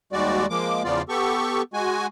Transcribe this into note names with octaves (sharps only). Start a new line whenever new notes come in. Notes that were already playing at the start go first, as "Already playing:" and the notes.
D#2 G3 G#3 F#4 D5
F3 G#3 A#3 D6
E2 C#3 F3 B3 F4 D5
B3 G4 A4 C#6
G#3 F#4 G#5